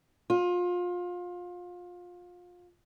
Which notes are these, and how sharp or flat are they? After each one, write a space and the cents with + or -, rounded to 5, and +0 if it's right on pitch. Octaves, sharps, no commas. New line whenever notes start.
F4 +25